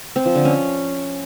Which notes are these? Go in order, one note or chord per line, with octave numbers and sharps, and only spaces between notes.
C4
F3
D3
C#4